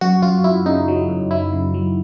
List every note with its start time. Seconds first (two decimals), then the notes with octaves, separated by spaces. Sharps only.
0.01 F#2 F#4
0.22 F#2 F4
0.44 F#2 E4
0.66 C#3 D#4
0.88 F#3
1.09 F#2
1.31 F#3 E4
1.53 C#3
1.74 F#3